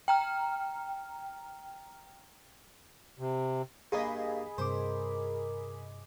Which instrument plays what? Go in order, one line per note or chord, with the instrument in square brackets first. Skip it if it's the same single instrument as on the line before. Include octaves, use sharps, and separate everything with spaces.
[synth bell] G5 A#5 F6
[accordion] C3
[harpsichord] G2 A#3 [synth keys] G#4 D#5 B5
[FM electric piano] G2 C3 D6 [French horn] A#4 [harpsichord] C5